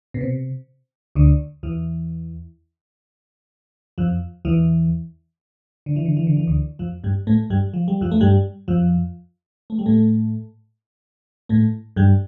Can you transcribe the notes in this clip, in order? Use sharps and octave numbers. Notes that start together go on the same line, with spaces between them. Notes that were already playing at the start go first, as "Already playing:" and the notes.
B2
C3
D2 D3
E2 E3
F2 F3
E2 E3
D3
E3
D3
E3
D3
E3
D2 D3
F2 F3
G2 G3
A2 A3
G2 G3
F3
G3
F2 F3
A3
G2 G3
F2 F3
A3
G3
A2 A3
A2 A3
G2 G3